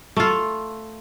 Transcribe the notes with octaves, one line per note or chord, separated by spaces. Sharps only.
A3 F4